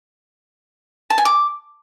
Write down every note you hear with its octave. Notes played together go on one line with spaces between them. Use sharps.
A5
G#5
D6